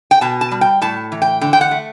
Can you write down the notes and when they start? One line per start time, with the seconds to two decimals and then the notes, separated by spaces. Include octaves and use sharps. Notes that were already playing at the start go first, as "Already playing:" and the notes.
0.11 G5
0.21 B2 A5
0.41 A5
0.51 G3
0.61 G5
0.81 A2 A5
1.12 E3
1.22 G5
1.41 D3 G5
1.53 G5
1.61 F#5
1.71 A3